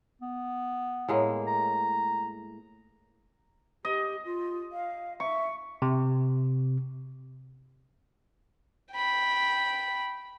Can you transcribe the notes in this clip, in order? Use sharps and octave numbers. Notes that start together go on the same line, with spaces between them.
B3
A2 G#3 A#3
A#5
G4 D#5
F4
F5
E5 C#6
C3
G5 B5